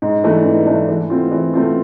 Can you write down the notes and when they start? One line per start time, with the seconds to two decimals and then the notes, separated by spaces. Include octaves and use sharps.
0.02 G#2
0.24 E3 A3 D4
0.46 G#2
0.67 E3 A3 D4
0.89 E3
1.10 A3 C4 F4
1.31 E3
1.54 A3 C4 F4